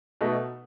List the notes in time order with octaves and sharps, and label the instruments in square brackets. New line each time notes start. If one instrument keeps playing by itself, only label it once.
[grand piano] B2 A3 D#4